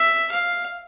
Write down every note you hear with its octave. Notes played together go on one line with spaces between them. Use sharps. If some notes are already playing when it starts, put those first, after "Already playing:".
Already playing: E5
F5